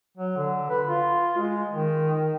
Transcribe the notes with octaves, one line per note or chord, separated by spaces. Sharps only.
F#3
D3
B4
F4
G#3
D#3